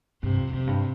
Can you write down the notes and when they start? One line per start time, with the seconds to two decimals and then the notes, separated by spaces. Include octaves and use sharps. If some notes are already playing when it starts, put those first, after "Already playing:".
0.23 G2 C3
0.37 F2
0.53 F2 C3
0.67 G2